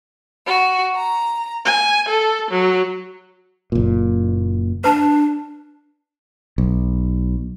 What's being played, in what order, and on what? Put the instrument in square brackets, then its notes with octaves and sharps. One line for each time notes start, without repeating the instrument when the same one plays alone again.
[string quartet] F#4
A#5
G#5
A4
F#3
[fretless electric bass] F#1 A#2
[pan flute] D4 [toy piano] B4 A5
[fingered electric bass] B1